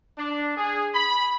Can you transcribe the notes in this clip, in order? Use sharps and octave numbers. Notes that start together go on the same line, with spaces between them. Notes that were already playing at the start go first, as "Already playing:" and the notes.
D4
G#4
B5